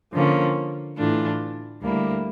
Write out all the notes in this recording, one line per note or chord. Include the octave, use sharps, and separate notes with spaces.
D3 F3 A#3 C#4
A2 E3 A3 D4 F4
D2 D3 G3 A#3 E4